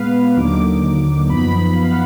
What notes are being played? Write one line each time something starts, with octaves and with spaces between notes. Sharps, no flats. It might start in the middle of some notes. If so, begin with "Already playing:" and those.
Already playing: A#2 G#3 B3 B4 F5
D#2 D3 F#3 A#3 D#4 D6
F#2 F3 B3 D#4 B5
F5
F#5